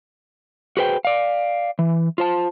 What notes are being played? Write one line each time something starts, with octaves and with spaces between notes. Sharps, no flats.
F#4 G#4 B4 C5 G5
D5 F5
E3
F4 C5 A5